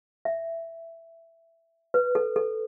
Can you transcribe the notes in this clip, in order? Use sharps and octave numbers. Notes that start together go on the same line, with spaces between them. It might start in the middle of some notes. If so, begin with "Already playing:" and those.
E5
B4
A4
A4